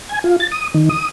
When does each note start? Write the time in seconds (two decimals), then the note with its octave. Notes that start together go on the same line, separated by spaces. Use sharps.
0.09 G#5
0.24 F4
0.40 A6
0.52 D#6
0.74 D#3
0.89 D#6